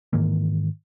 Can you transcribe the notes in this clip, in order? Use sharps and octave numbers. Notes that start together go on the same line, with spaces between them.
G#2 D#3 E3 A#3